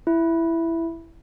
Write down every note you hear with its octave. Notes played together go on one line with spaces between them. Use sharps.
E4